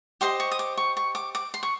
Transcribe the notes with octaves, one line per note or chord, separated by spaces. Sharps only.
G4 C5 D#5 C6
C#6
D#6
D6
C#6
C#6
D6
D6
C6
C#6